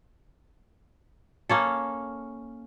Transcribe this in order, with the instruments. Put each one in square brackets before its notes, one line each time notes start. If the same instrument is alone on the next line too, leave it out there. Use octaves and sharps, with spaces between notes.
[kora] A#3 C#4 A4